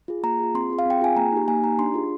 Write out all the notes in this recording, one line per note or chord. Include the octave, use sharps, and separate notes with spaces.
F4 G#4
A#3 A#5
F4 G#4
C4 C6
F4 G#4
F5
C4 G5
F4 G#4 G#5
A#3 A#5
D#4 G4
A#3 G#5
D#4 G4 A#5
D4 C6
F4 G#4